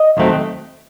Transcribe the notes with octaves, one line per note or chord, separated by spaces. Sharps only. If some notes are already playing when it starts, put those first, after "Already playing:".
Already playing: D#5
D#2 D#3 F#3 A3 C4